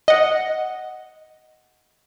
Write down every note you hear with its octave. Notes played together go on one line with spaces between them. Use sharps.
D#5 F#5